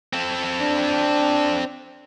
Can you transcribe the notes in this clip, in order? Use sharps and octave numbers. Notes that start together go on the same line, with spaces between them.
C4 A4
D4